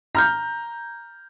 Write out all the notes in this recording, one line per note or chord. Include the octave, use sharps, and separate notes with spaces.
A#5 F6 G6